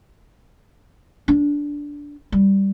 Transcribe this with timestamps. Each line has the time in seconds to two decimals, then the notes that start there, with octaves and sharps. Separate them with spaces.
1.28 D4
2.32 G3